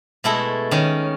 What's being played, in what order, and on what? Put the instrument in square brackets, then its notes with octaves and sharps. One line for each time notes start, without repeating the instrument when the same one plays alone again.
[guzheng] B2 G#3 A3 E4 A4
D#3 C#4